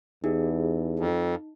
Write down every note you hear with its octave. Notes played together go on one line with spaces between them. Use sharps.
E2 D#4 E4 G4 G#4
F2